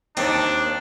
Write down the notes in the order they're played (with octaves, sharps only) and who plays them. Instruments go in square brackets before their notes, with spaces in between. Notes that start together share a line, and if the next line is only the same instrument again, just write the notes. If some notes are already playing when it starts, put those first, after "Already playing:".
[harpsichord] D#2 C4 [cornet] D4 [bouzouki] D#4